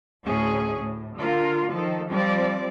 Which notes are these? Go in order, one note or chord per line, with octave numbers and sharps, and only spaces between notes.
D2 A2 C#4 G#4
A2
D3 F4 A#4
D#3 F3 A4
F3 G3 C4 D5